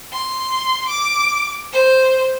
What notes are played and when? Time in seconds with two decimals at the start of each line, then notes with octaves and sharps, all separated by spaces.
0.13 C6
0.88 D6
1.73 C5